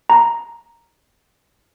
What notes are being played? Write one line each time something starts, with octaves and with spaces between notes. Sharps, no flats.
A#5